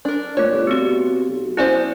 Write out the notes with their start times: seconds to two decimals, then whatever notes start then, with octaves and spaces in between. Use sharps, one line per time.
0.05 D4 A#4
0.37 A#2 A3 C#5 D5
0.52 G1
0.67 B2 B3 C4 G4
1.29 B1
1.57 B3 C#4 E4 C5 D5 E5